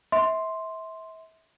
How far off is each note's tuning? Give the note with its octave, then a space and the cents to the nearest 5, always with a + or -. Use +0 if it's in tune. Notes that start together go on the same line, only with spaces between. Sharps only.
E5 -30 C6 +0